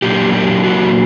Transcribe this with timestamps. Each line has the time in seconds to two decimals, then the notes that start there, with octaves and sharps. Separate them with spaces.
0.02 A#2 F#3 A#3 D4 G4
0.33 G4
0.64 F#4